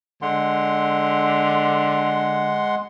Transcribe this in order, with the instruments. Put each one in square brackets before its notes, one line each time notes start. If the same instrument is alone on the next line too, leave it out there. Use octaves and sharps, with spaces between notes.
[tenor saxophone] D3 [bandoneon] G#3 F#5 C6